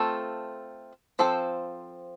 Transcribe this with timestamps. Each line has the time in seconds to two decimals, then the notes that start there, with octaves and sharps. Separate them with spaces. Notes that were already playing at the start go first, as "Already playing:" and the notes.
Already playing: A3 C4 F4 A4
1.19 F3 C4 A4 C5